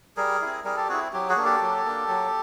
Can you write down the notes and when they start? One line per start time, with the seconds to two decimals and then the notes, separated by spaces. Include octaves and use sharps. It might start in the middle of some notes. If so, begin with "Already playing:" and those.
0.17 G3 G#4 A#4
0.42 C4 E4
0.64 G3 G#4 A#4
0.77 G4 A4
0.89 C4 E4 F#4 G#4
1.13 F#3 G4
1.29 F#4 G#4
1.36 A#3 D4
1.45 G4 A4
1.62 F#3
1.85 A#3 D4
2.08 F#3